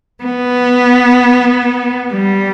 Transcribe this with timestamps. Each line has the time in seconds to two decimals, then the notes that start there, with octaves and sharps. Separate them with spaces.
0.23 B3
2.13 G3